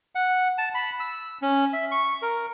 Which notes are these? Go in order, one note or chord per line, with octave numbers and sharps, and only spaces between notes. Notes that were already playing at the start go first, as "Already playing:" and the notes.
F#5
A5
B5
E6
C#4
E5
C#6
A#4